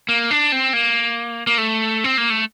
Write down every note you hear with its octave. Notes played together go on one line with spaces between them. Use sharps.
A#3
D4
C4
A#3
A#3
A3
C4
A#3
A3